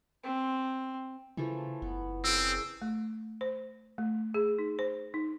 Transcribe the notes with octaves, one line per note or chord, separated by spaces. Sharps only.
C4
C#3 E3 F3 A3
F#1 B3
C#3 C4 G#4 A#4 E6 D7
A3
C5
A3
G#4
D#4
C5
D#4